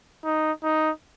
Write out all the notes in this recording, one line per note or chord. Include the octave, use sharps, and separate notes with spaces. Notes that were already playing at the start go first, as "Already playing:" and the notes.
D#4
D#4